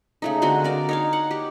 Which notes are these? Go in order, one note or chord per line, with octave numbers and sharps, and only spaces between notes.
C#3 A3 D#4
D3 G#3 C4 F#4
A#4 D5
D#4 C#5 F5
F#5
G4